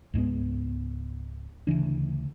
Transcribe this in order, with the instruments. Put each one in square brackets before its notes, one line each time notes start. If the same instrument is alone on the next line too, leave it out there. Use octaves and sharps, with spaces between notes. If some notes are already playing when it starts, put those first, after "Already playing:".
[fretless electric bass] C#2 G#2 G#3 B3
D2 C#3 E3 D4